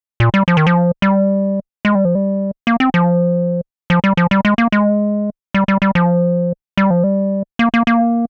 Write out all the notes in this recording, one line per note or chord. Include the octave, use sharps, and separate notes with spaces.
A#2
G3
F3
D#3
F3
G3
G#3
G3
F3
G3
A#3
C4
F3
F3
G3
F3
G3
G#3
A#3
G#3
G3
G3
G3
F3
G3
F3
G3
A#3
A#3
A#3